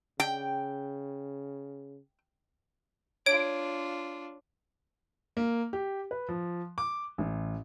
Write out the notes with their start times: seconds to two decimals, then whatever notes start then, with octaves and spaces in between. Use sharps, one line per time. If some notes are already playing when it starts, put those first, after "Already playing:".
0.20 C#3 G5
3.26 D4 F4 C#5 D7
5.37 A#3
5.73 G4
6.11 B4
6.28 F3
6.78 D6
7.18 A1